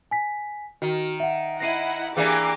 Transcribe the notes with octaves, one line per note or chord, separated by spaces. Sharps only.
G#5 B6
D#3 F#4
E5 F#5
E4 D#5 F#5 A#6 C7 D#7
E3 A#3 D4 G4 G#4 G#5 D6